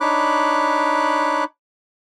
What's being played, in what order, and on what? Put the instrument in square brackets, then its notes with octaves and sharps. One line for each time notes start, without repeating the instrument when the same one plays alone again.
[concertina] D4 D#4 C#5 B5 D6 F#6